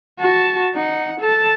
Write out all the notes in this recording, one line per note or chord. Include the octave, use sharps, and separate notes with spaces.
F#4 A5
D#4 F#5
A4 A5